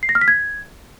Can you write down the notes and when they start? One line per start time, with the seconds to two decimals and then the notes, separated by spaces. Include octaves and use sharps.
0.03 C7
0.09 A#6
0.15 F6
0.21 B6
0.28 G#6